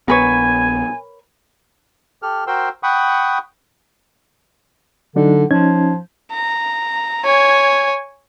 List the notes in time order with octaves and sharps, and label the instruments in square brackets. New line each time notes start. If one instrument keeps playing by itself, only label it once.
[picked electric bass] A#1 B3 [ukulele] A#4 B4 C#5 [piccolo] G#5
[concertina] G4 A4 F6
F#4 A#4 C5 G5 C6 E6
F#5 G5 B5 C#6 D#6
[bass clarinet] D3 [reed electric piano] F#3 D4 D#4
[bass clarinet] F3 [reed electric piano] C#4 D#4 G#6
[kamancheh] A#5
C#5 G#5